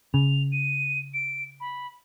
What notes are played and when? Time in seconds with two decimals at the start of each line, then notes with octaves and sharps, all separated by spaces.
0.14 C#3 F7
0.52 D#7
1.14 D7
1.60 B5